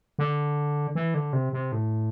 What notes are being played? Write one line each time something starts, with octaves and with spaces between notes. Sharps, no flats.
D3
E3
D3
C3
C3
A2